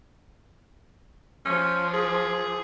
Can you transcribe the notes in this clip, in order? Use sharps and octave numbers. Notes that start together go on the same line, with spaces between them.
F3 C#4
G#4